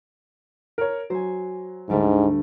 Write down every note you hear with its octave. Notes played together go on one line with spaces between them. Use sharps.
A#4 C#5
F#3 C5 G#5
D2 G#2 G3 A3